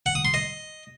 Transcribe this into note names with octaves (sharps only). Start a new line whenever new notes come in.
F#5
D#6
C6
D#5